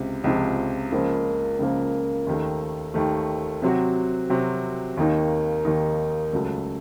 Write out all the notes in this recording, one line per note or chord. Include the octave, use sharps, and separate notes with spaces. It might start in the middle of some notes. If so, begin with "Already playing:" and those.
Already playing: C#2 C3
C#2 C3 F3
C#2 C#3 F3 A#3
C#2 C#3 F3 A#3
D#2 D#3 A3
D#2 D#3 A3
C3 F#3 C4 F#4
C3 F#3 C4 F#4
D#2 D#3 A#3 D#4
D#2 D#3 A#3 D#4
C#2 C#3 F#3 A3